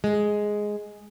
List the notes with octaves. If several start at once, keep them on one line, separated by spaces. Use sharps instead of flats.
G#3